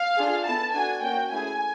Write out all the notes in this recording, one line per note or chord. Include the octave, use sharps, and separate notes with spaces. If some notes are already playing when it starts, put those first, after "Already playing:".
Already playing: F5
D4 F4 G#4
B3 E4 A4 A5
D4 F#4 A4 G#5
A#3 C#4 F#4 G5
A3 C#4 E4 G#4 G#5